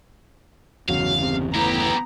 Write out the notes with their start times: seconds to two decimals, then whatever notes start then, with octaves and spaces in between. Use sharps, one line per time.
0.88 G1 E2 C#3 F#3 F5
1.21 C3
1.54 A2 B3 E4 G4 A#5